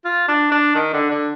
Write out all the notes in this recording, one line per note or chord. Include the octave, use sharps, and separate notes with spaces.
F4
D4
D4
D#3
D3
D3